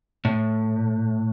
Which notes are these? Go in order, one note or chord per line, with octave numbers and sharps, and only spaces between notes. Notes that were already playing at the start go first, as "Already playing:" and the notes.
A2